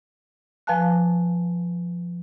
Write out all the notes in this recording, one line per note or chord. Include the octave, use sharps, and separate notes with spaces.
F3 B4 F5 G#5 A5 F#6